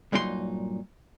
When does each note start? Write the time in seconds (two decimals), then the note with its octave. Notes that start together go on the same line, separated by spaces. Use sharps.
0.12 G2 A#2 F#3 D#4 A4 C6